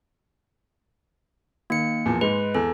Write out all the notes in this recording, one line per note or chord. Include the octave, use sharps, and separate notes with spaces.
D#3 A#3 C#7
E2 A#2 F3
G#2 G#3 B4
E2 A4